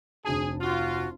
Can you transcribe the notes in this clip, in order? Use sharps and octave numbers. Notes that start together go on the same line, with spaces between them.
F1 D2 G#4 A5
F4 F#4